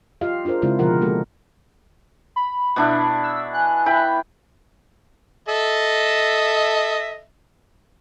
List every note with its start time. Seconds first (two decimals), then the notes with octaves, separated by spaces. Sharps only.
0.21 F4 G4 D#5 F5
0.45 D4 F4 G#4 A#4 C5
0.62 C#3 G#3 C4 E4 F4
0.79 B2 D3 F3 G4 A#4 F#5
1.01 G#3 A#3 F#4 G#4 A4
2.36 B5
2.76 B2 D4 E4
3.23 E6
3.54 G#5 F#6
3.86 E4 G5 B5
5.48 A4 D#5 E5